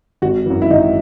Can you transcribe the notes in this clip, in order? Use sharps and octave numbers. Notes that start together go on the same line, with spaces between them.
G#1 F#4
F#2 E3
E4
G#1 D#4